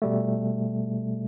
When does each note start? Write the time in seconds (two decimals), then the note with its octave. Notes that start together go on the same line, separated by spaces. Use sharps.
0.02 B2 G3 A3